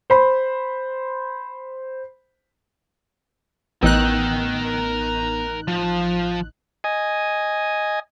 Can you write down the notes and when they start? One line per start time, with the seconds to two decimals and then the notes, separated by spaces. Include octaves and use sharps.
0.10 C5 B5
3.83 A1 B3 D#4 A#4 G5 E6 F#6
5.68 F3
6.84 D#5 G#5